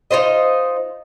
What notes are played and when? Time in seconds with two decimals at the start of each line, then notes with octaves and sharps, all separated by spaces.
0.11 D#4 F4 C5 D#5